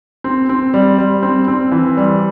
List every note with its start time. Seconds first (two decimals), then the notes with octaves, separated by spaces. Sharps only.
0.24 C4
0.49 C4
0.74 G3
0.98 G3
1.23 C4
1.48 C4
1.72 E3
1.97 G3